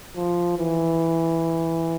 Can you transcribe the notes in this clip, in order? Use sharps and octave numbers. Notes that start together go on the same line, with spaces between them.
F3
E3